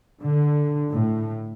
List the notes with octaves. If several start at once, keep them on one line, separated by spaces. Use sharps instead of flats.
D3
A2